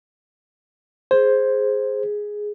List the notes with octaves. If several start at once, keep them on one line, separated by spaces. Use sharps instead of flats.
G#4 C5